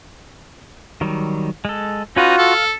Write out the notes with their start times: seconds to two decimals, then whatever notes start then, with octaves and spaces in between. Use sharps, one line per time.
1.01 D#3 F#3 G3
1.65 G#3 A4
2.16 C#4 D#4 F4 F#4 B4
2.38 A4 F5